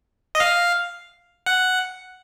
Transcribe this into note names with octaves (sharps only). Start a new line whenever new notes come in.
D#5
F5
F#5